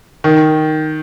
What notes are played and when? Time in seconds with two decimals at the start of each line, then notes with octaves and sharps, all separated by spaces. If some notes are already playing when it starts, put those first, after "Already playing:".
0.24 D#3